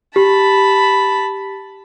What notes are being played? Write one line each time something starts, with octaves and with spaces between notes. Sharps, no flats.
G4 A5 B5